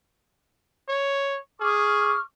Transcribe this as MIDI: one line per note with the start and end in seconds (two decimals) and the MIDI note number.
0.89 1.39 73
1.61 2.17 68
1.61 2.20 85
1.61 2.20 86
1.61 2.20 89